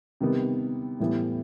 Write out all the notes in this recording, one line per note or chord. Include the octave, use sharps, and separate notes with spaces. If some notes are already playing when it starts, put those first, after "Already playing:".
C3 D#3 G3 B3
A2 E3 G3 B3